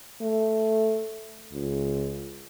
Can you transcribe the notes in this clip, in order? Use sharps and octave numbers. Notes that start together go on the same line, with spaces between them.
A3
C#2